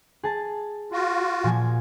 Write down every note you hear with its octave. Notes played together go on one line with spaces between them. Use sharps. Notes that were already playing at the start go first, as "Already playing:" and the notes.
G#4 A5
F4 F#4
A#2 F3 G#5